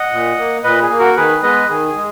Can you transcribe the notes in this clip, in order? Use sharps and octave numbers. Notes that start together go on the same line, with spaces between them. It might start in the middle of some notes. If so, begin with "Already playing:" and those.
Already playing: D#5 F#5
A#2
A#3
A#2 B4 D#5
G#4
A#3
F#4 A#4
D#3 G#4 B4
G#3 B3 B4 D#5
D#3 G#4
G#4
G#3